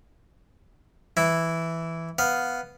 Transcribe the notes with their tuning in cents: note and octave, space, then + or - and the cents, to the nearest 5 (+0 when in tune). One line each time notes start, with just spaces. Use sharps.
E3 +0 E4 +0
B3 +0 F5 +0